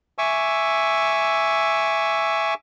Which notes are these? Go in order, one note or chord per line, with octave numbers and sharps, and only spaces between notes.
E5 G#5 C#6 D6 E6